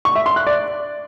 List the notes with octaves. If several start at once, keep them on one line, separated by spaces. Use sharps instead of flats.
C#6
E5
C6
F#6
D5